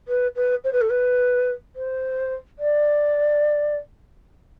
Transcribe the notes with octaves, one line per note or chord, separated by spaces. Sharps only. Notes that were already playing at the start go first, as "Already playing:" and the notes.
B4
B4
C5
B4
A4
B4
C5
D5